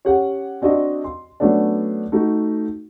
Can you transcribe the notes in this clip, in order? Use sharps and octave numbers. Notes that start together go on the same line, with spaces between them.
C#4 G4 F#5
C4 D4 F#4 D#5
C6
F#3 A3 B3 C#4 D4
A3 D#4 F#4